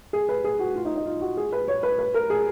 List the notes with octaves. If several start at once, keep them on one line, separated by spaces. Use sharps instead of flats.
G#4
B4
G#4
F#4
F4
D#4
D#4
F4
F#4
G#4
B4
C#5
B4
B4
A#4
G#4